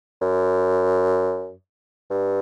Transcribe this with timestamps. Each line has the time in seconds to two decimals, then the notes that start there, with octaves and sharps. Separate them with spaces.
0.22 F#2
2.10 G2